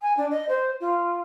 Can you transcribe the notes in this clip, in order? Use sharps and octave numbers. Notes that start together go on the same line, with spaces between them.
G#5
D4
D#5
C5
F4